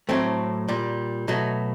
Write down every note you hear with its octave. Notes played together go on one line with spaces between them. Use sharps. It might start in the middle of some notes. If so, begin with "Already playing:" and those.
A2 F#3 A3 C4
A#2 G3
B2 F#3 A3